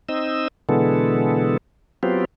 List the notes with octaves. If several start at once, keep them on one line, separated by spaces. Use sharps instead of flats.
C4 D#4 D#5 E6
B2 D3 E3 G#3 B3 A4
F#3 B3 C4 F4 G4